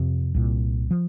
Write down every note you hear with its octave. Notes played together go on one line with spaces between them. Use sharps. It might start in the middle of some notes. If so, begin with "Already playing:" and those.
Already playing: F2 C3
C2 A#2
F3